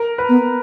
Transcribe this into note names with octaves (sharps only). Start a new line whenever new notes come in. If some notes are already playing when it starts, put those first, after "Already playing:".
Already playing: A#4
B4
B3